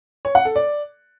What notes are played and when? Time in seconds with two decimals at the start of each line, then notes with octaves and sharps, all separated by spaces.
0.25 C#5
0.35 F#5
0.45 A4
0.56 D5